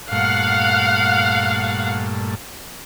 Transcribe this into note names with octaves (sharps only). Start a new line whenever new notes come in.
G2 A#2 A3 F5 F#5